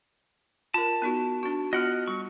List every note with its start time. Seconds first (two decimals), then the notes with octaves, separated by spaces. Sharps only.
0.74 F4 A#4 A5
1.02 B3 D#4 F#4
1.43 D4 F#4
1.73 B3 F4 F#4 D#5 F#5 F6
2.08 G3 C#6